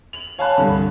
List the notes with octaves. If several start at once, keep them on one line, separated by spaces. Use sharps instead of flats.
F7 F#7
C#5 F5 G#5 A5 B5 F#6
C2 G2 D3